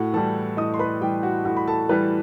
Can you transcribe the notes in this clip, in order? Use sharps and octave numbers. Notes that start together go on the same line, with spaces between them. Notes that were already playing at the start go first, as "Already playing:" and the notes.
Already playing: A2 F#4 F#5
E3 G3 A4 A5
A2 D#5 D#6
C6
B4 B5
E3 G3 G4 G5
F#4 F#5
A2 F#4 F#5
B5
A4 A5
E3 G3 B4